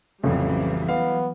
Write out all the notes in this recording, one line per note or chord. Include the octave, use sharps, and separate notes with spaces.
A1 F2 C#3 E3 F#3 G3
B3 F5